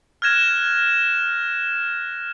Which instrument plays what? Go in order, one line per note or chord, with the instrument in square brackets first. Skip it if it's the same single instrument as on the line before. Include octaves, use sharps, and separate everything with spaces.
[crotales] F6 F#6 G#6 A#6 E7